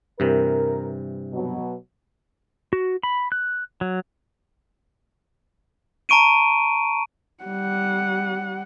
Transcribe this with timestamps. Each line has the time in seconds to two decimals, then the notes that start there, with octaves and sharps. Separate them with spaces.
0.20 G2 C3 E3 A#4
1.33 B2 F#3
2.73 F#4
3.03 B5
3.32 F#6
3.81 F#3
6.09 A5 A#5 C#6 D7 D#7
7.44 G3 F#5